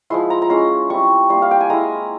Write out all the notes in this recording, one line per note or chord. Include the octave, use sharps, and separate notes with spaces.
F3 G#3 E4 C6
A#5
A#5
G#3 C#4 E4 C6
G3 C4 E4 C#6
G3 A#3 E4 C6
F5
G5
G#5
G#3 E4 A#5